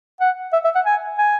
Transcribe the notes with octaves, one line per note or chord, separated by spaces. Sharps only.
F#5
E5
E5
F#5
G#5
G#5